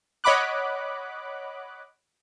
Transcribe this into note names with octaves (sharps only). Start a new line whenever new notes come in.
C#5 D#5 F#5 B5 D6 F#6